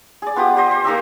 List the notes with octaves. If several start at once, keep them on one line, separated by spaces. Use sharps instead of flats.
G#4 D5
B3 F4 G4 D#6
G4 C5 D#5
C5
A#3 D#4 G4 E5